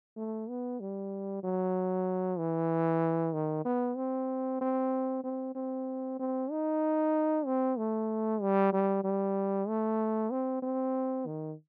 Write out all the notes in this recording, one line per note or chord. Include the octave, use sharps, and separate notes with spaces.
A3
B3
G3
F#3
E3
D#3
B3
C4
C4
C4
C4
C4
D#4
C4
A3
G3
G3
G3
A3
C4
C4
D#3